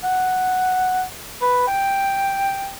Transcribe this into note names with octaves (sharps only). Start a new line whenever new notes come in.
F#5
B4
G5